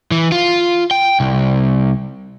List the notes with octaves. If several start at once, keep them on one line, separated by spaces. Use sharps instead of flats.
E3
F4
G5
C2